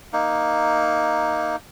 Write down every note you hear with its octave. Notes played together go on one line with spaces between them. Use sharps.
A#3 D#4